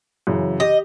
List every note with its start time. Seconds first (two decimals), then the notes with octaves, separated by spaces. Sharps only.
0.27 F#2 C#3 E3
0.60 G4 D#5